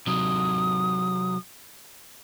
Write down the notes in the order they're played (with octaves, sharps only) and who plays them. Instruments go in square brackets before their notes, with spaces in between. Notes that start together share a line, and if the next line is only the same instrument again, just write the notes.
[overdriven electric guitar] C3 F#3 [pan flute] D#6